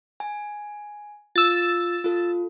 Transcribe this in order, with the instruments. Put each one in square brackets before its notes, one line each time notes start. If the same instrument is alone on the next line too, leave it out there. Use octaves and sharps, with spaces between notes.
[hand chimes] G#5
[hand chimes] F4 [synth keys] E6 A6
[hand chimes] F4 A4